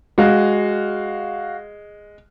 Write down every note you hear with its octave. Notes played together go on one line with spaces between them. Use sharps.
G#3 F#4 F5